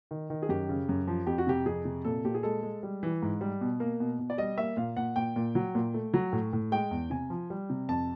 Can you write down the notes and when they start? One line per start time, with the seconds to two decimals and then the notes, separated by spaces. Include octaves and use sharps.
0.11 D#3
0.30 D#3
0.42 G#4
0.49 F#2 G4
0.69 C#3
0.89 F#2
1.07 F3
1.27 F2 G4
1.38 F#4
1.47 C3 G4
1.66 F2 G#4
1.85 C3
2.05 A#2 A4
2.25 A#2 G4
2.35 G#4
2.43 G#3 A4
2.63 G#3
2.83 G3
3.03 E3
3.22 G#2
3.41 G3
3.61 B2
3.80 A#3
4.00 B2
4.19 B2
4.30 D5
4.38 G3 D#5
4.58 A#3 E5
4.77 A#2 F5
4.97 A#2 F#5
5.16 A#2 G5
5.36 A#2
5.55 F#3
5.75 A#2
5.94 A3
6.14 F#3
6.32 A2
6.53 A2
6.72 G#3 G5
6.91 E2
7.10 C3 G#5
7.30 F3
7.50 G3
7.70 C3
7.88 F2 A5